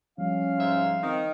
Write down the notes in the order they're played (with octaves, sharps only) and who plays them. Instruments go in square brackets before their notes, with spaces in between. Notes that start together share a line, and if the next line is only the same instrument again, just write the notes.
[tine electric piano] F3 G3 [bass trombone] C#4 [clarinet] F5
[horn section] G#2 F4 E5
[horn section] D#3 [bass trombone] C4